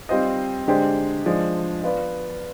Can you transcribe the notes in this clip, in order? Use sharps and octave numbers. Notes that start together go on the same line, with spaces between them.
G3 C4 F4 C5 D#5
D3 G#3 D4 G4 C5
F3 G#3 D4
B3 F4 B4 D5